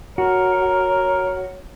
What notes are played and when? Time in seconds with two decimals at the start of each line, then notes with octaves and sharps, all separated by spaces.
0.18 F#4 A#4 C#5